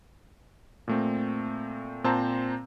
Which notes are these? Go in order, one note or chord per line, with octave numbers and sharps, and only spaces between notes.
A#2 A3 C4
A#2 C4 C5 A5 A#5